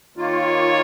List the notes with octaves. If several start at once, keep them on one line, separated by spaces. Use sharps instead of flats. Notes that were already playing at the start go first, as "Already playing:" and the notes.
D#3 A#3 F4 C#5